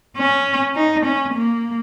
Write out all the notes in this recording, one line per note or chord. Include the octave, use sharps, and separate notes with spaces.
C#4
D#4
C#4
A#3